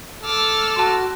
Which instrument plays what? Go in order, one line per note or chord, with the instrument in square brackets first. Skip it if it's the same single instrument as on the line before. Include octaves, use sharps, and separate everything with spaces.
[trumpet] A4 [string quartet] D6 E6 F6
[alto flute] F#4 [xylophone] A5 C6